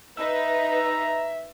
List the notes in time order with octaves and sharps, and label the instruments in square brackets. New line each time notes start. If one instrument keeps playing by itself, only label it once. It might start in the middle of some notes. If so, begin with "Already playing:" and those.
[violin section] D#4 B4 [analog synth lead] E5 [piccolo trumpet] A#5